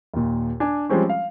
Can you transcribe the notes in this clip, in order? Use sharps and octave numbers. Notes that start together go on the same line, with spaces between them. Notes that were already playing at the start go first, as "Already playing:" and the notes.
D#2 A#2
D4 G#5
F3 G3 G#3 C4 C#4
F5